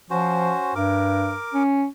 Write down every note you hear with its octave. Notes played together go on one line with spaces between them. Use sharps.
F3 C#4 F#4 C5
G2 A#4 D6
C#4